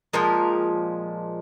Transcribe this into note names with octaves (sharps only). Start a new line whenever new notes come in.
A#2 F3 G#3 A#4